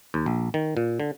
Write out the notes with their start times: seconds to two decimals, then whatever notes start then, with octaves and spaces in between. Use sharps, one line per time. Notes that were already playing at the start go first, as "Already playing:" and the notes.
0.14 D#2
0.26 A#1
0.54 D#3
0.77 A#2
1.00 D3